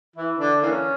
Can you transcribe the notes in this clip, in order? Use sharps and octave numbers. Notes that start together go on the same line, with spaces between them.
E3 E4
D3 D4
E3 A#3 C#4